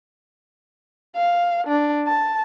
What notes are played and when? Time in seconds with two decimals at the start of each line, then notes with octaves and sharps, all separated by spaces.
1.16 F5
1.67 D4
2.07 A5